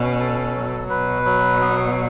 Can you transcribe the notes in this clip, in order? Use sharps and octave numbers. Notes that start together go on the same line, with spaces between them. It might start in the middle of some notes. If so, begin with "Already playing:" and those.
Already playing: B2 C#4
A4
F#3
B2 B4
F#3
B3